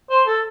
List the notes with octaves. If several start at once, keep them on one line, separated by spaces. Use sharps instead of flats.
C5
A4